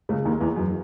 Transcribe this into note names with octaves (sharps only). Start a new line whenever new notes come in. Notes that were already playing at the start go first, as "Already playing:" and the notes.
C#2 C#3
D#2 D#3
E2 E3
F#2 F#3